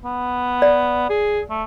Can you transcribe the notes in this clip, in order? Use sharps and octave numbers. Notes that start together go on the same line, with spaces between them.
B3
D5
G#4
A3